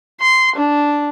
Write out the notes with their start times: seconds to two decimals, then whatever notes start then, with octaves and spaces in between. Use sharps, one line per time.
0.20 C6
0.56 D4